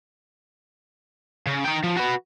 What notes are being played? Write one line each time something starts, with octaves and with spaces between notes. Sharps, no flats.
C#3
D#4 G5
F3
F#4 B4